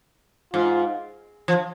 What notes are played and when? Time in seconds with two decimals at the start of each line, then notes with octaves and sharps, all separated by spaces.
0.53 G#2 F4
1.48 F3